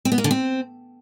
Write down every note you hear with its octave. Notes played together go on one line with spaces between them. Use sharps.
C4
B3
A#3
D3
C4